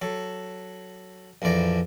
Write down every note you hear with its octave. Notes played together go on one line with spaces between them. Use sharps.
F#3 A4
A#1 F2 E3 D5 A#5